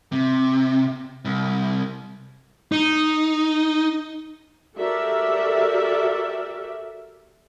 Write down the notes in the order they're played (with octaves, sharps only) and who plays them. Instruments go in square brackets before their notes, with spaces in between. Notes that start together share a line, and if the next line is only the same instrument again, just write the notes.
[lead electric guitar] C3
C2
D#4
[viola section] F#4 G4 A4 A#4 D5 E5